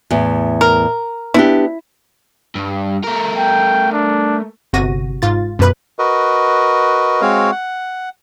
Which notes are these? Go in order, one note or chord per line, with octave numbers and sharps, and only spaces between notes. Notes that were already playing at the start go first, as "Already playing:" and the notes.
E2 A2
A#4
B3 D4 E4 G4
G2
A3 A#4
G5
D4
G1 C3 F#4 A#6 D#7
G#2 F4 A6
F#2 B2 B4 B5
F#4 A#4 B4 D#5
G#3 C4 F#4 C#5 F5
F#5